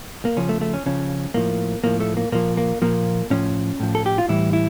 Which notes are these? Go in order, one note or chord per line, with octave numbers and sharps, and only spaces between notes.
A#3
C#3 F3 C#4
A3
A3
C#4
C#3 F3 C#4
A2 F3 A#3
A2 F3 A#3
A3
A#3
A#2 F3 A#3
A#3
A#2 F3 A#3
A2 F3 C#4
A2 F3
A4
G4
F4
A2 E3 G3 E4
E4